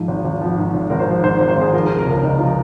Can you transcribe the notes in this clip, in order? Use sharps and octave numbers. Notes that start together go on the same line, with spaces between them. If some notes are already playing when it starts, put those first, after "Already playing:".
Already playing: G#2 F3
G#1
G#1
F3
G#2
G#1
G#1 A#4
C5
F3
G#2 C5
C5
G#1
C5
G#1 G#4
F3 A#4
A#4
C3
A#4
C#2
C#2 D#4
F3 F4